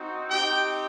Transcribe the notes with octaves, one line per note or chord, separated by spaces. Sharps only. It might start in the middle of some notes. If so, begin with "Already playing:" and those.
Already playing: C4 D#4 F#4
C4 D#4 G4 G5